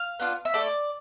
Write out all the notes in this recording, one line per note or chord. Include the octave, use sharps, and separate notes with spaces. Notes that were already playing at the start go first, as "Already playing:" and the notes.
Already playing: F5
B3 D4 F4
E5
A3 E4 A4 D5